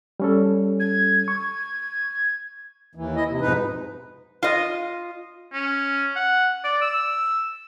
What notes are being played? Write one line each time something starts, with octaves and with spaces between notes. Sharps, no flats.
G3 C#4 A4
G#6
C#6
D#2 E3
E4 D#5
C3
F2 G#2 B2 D#4 B4
F4 D#5
C#4
F#5
D5
E6